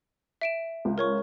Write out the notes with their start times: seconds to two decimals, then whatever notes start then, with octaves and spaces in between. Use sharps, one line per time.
0.41 E5 D7 E7
0.85 C#2
0.98 A#4 C#5 C#6